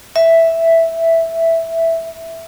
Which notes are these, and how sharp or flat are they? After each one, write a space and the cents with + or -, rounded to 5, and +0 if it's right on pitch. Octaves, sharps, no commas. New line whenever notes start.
E5 +0